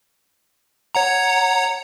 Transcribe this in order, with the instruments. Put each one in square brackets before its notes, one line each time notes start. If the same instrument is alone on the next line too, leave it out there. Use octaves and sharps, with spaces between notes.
[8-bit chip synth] C#5 F#5 A#5